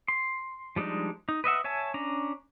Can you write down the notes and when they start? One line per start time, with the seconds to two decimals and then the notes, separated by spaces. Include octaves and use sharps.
0.08 C6
0.76 F3 G3 G#3 D4 D#4
1.29 D#4
1.44 B4 D#5 E5 F#5
1.64 C#5 E5 G#5 A5
1.94 C#4 D4 A#5